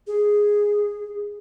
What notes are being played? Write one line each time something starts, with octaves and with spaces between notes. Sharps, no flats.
G#4